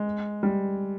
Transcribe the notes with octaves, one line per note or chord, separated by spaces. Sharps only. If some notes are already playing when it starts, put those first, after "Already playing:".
Already playing: G#3
G3